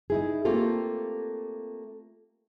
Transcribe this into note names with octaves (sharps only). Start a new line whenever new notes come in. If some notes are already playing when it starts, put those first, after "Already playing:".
D#4 E4 G#4
A3 A#3 C4 F4 G4 A4